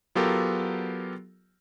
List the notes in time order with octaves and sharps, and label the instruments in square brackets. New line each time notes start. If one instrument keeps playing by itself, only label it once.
[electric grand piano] F#3 B3 F4 G4 A4 A#4